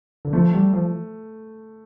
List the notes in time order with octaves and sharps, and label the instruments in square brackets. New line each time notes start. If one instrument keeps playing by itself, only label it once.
[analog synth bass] D3
[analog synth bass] F3 [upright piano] A3
[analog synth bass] G3
F3